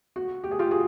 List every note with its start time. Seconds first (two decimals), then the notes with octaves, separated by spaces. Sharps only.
0.16 F#4
0.44 G4
0.51 G#4
0.59 F4 G4
0.71 F#4 G#4